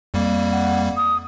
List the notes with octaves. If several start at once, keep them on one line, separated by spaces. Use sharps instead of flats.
F2 G3 A#3
F#5
D#6